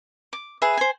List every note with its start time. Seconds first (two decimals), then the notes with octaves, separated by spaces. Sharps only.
0.33 D6
0.62 G#4 B4 E5
0.77 C5 G#5